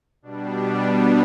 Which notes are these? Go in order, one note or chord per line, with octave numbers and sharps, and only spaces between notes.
B2 G3 D4
B3
B3